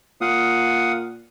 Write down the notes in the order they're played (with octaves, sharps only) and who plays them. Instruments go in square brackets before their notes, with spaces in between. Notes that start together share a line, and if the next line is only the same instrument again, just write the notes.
[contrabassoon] A#2 [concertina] F5 F#5 D#6